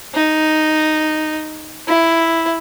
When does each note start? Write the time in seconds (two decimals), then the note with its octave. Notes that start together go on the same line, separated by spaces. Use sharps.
0.15 D#4
1.88 E4